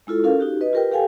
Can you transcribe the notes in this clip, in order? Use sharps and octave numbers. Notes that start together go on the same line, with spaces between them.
G#3 E4 F4 A4
C#4 F4 A4 A#4 F5
D#4 F#4 G4
B4 D#5
F4 G4 A#4 B4 G5
G4 A4 F5 G5 G#5